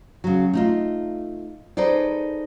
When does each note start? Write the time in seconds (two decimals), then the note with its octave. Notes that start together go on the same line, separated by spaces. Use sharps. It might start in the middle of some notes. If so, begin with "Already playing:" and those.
0.24 C#3 F#3
0.53 A3 D#4 F4
1.77 D#4 G#4 A4 B4 C5 D5